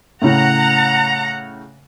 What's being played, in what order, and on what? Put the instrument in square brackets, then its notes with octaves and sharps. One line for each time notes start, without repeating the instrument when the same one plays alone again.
[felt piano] A2 C#3 [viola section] F#5 A#5